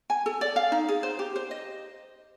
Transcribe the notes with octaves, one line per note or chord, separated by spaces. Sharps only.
G#5
A4
D5
F5
D#4
G#4
C5
G4
C5
D#5